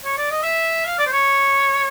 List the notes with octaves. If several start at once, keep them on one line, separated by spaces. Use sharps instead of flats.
C#5
D5
D#5
E5
F5
D5
C5
C#5